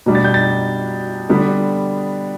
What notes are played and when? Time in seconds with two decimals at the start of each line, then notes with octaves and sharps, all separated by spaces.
0.06 B2 G3 D4
0.15 A6
0.24 G6
0.34 A6
1.29 D3 G3 B3 D4